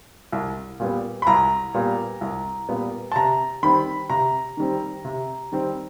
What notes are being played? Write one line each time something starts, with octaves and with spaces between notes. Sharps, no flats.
C2
A#2 G3 B3
B5
C2 A#5
A#2 G3 B3
C2
A#2 G3 B3
A5
C3 A#5
D#3 G3 C4 B5
C3 A#5
D#3 G3 C4
C3
D#3 G3 C4